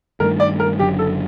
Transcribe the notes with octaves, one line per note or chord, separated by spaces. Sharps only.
G2 D#3 A3 A#4
D5
A#4
F#1 F#2 D3 F#3 G4
A4